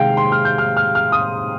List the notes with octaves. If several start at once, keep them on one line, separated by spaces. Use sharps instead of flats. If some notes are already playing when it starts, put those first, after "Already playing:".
Already playing: C3 D#3 G#3 F5 G5
C6
F6
G6
F6
F6
F6
D#6